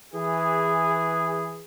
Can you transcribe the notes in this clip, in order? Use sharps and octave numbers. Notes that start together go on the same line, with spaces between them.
E3 G#4